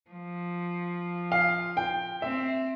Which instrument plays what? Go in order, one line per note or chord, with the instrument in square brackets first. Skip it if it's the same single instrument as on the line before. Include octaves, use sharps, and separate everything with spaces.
[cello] F3
[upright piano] F5
G5
[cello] C4 [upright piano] E5